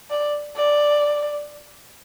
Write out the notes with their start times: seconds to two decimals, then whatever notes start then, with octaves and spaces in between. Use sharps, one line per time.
0.10 D5
0.56 D5